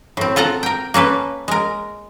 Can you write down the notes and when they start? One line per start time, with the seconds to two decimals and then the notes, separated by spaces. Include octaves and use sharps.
0.17 A2 C4
0.36 F4 A4 F#5 A#5
0.63 A#4 G5
0.94 A#3 C#4 A4 B4
1.48 G#3 A#4